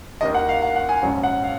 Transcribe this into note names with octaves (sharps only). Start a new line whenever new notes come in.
D#2 D#3 A#3 D#5
F#5
F5
F#5
F#5
G#5
A#1 G#2 F#3 C#4 F#5
F#5
F5